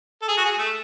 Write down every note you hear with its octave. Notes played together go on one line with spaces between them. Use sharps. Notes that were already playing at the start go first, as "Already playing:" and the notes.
A4
G#4
F#4
G#4
A3